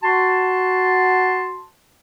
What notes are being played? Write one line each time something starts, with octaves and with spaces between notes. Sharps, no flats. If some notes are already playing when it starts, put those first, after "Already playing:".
F#4 A5 C6